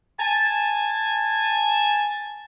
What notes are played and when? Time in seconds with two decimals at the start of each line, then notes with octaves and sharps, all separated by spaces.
0.20 G#5 A5